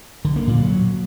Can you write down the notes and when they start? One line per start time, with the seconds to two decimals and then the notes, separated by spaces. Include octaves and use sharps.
0.25 D3
0.36 A#3
0.47 A#2
0.59 F#3